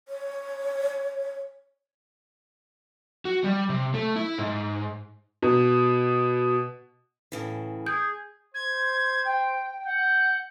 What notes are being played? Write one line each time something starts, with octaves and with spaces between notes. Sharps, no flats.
C#5
F#4
G3
C3
A3
E4
G#2
B2
A2 C#3 E3
G#4 G6
C5 G#6
G5
F#5 G6